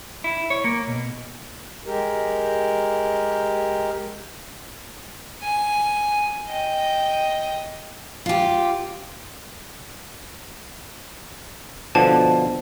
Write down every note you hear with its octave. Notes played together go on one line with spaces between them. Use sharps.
E4
C#5
A#3
B2
G#3 G4 A#4
G#5
D#5 G5
F4 G4
B2 D3 F3 A5